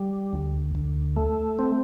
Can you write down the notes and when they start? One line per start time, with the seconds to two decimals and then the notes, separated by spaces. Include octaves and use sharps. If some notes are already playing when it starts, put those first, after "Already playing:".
Already playing: G3
0.33 D2
0.75 D2
1.16 A3
1.59 C4